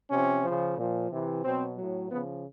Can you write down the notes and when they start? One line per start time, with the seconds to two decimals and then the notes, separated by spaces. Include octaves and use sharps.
0.10 C3 F3 C#4
0.43 F3
0.48 C#3
0.77 A#2 F3
1.10 C3 E3
1.44 B2 F#3 C4
1.77 A2 F#3
2.10 C#3 F3 B3